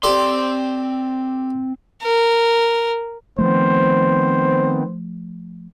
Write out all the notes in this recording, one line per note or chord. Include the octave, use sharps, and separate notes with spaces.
C4 G4 A4 D5 C6
A#4
D#3 F3 A3 B3 C4 C5